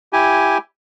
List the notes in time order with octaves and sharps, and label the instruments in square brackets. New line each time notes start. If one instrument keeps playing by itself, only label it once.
[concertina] E4 G4 G#5